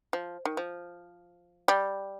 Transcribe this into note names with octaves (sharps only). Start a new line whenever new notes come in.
F3
D#3
F3
G3